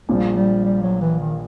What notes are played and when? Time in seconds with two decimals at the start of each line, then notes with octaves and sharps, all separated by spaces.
0.09 A#1 A#2 F3 G3
0.36 G3
0.65 G3
0.83 F#3
1.01 E3
1.20 D#3